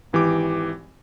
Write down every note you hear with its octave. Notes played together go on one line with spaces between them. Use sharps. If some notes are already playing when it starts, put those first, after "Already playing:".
G#1 E3 G4 D6